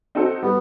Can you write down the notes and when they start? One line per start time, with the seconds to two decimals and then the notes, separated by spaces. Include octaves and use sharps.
0.15 C4 D#4 F#4 A4
0.42 G3 B3